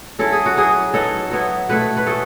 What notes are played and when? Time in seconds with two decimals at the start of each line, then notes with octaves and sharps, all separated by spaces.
0.19 F#3 C#4 E4 A4
0.32 G#4
0.46 F#4
0.56 F#3 B3 E4 G#4
0.94 F#3 B3 D#4 A4
1.31 F#3 B3 E4
1.69 B2 A3 E4 B4
1.97 B4
2.06 B2 A3 C#4 A4